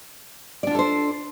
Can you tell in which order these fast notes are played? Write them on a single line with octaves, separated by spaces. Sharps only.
D5 D4 F4 A4 C5